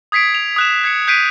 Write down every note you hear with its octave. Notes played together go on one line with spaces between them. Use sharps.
D#6 G#6 B6 C7 D7
F7
D#6 F#6 E7
G#6 C7 C#7
F#6 G6 B6 C7 D7 D#7